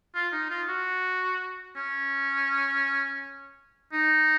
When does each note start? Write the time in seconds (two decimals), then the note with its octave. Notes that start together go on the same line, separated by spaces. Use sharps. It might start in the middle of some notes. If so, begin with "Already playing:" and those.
0.15 F4
0.32 D#4
0.50 F4
0.68 F#4
1.76 C#4
3.93 D#4